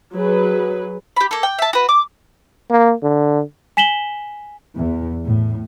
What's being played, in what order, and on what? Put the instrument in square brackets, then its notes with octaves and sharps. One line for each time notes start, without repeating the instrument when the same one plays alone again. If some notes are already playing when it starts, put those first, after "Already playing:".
[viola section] F#3 G#4 B4
[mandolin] G4 B5
A#3 A4
G5
E5 A5
F#4 B4
D6
[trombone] A#3
D3
[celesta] G#5 B6 E7 F#7 G7
[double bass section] E2
A2